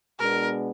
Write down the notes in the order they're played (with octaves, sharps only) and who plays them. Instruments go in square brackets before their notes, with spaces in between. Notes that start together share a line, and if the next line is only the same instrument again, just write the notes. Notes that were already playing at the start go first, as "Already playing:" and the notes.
[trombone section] B2 G#3 B3 D4 [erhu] A#4